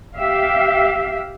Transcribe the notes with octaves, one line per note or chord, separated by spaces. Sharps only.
G4 E5 F5